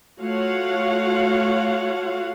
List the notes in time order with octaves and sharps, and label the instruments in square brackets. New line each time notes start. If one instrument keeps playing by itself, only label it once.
[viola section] A3 F4 F#4 C#5 F5 F#5